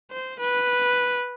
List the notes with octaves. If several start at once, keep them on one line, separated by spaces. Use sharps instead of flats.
C5
B4